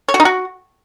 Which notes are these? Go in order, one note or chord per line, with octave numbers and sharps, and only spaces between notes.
C#5
F#4
D#4
F#4